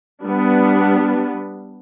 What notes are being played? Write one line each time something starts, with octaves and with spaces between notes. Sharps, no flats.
G3 B3 D4